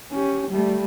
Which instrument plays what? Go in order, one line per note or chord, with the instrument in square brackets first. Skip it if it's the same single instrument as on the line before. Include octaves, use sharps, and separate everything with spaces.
[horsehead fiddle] C#4 G4
G3 A3